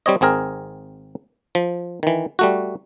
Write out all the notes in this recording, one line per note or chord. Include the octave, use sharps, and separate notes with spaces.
G3 C4 C#5 D#5
G#1 C4 G#4 A#4
F3
D#3 E3
G3 A3 F#4